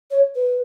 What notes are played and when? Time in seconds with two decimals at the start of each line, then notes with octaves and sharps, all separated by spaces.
0.10 C#5
0.35 B4